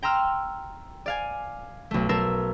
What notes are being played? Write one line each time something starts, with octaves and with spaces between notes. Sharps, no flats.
G5 A#5 C6 E6 F6
D5 F5 G#5
B1 A3
B1 A#4 A5 E6 C7